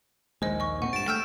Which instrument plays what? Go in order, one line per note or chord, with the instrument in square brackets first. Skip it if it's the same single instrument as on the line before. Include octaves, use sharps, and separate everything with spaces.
[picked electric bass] A#1 D#2 [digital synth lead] G#3 [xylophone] C5 D#5
[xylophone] D#5 C#6
[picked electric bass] A#2 A3 C4 [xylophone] F#5 [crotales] C#6
[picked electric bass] G2 [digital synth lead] A6 [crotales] D7 E7
[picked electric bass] A3 [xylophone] G5 E6 G6 [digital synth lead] F6